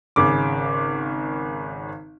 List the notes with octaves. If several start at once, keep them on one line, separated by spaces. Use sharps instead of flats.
G#1 C#3 D6